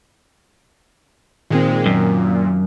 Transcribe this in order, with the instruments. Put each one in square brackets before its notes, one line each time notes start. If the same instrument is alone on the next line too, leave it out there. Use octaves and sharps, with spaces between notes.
[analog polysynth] A#2 G#3 [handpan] D#3 C4
[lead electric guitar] F#2 [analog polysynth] A#2